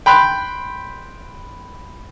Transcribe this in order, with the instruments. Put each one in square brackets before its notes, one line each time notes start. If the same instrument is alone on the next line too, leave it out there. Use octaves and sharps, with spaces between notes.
[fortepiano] G5 B5 C6 F#6